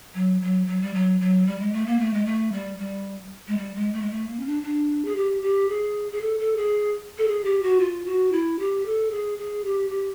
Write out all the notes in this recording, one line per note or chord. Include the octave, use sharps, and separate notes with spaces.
F#3
F#3
F#3
G3
F#3
F#3
G3
G#3
A3
A#3
A3
G#3
A3
G3
G3
G#3
G3
G#3
A3
G#3
A3
A#3
C#4
D4
D4
G#4
G4
G4
G#4
G#4
A4
A4
G#4
A4
G#4
G4
F#4
F4
F#4
E4
G4
A4
G#4
G#4
G4
G4